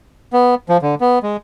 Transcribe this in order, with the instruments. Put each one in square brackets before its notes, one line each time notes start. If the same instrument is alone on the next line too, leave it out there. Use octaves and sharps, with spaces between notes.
[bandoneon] B3
F3
D3
B3
G#3